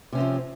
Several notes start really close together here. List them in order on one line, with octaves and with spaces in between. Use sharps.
C3 C#4 C4 F3